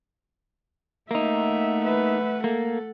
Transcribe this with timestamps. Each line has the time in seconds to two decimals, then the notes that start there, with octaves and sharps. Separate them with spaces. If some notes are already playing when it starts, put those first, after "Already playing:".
1.11 A3 A#3 D#4 E5 F#5
1.85 B4 E5
2.44 A#3 A4